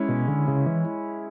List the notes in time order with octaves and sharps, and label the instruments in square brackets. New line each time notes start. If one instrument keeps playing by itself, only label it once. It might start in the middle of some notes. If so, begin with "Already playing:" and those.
Already playing: [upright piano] G#3 C#4 E4
[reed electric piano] B2
D3
C#3
E3